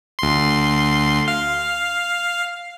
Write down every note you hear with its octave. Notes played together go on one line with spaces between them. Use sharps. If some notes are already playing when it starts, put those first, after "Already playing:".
D2 C6
F5